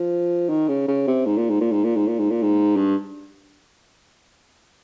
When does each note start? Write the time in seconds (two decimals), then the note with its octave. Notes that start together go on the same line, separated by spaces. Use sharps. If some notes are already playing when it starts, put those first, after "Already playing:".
Already playing: F3
0.49 D#3
0.68 C#3
0.88 C#3
1.07 C3
1.25 G#2
1.37 A#2
1.49 G#2
1.61 A#2
1.72 G#2
1.84 A#2
1.96 G#2
2.07 A#2
2.19 G#2
2.30 A#2
2.42 G#2
2.76 G2